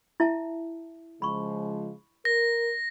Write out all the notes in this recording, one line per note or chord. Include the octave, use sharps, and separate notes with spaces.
E4 E5 A5
C#3 F3 G#3 B5 C#6
A#4 A#6